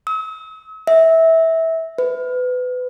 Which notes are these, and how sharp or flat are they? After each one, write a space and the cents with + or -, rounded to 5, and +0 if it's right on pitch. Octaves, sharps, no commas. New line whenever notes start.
E6 -45
E5 -20
B4 +25